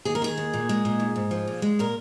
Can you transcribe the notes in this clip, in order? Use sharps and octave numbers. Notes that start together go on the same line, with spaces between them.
D#2 G#4
A#4
D#3 G#4
D#2
A#2
G#3
A#2
G#2
G#2
F3
A#2
G#3
A#2 A#4